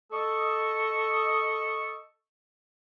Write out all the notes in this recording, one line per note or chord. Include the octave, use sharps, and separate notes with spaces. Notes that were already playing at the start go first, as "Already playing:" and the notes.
A4 D#5 C#6